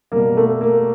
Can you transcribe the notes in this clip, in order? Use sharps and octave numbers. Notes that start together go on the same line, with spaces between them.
B2 G3 A#3
A3
A#3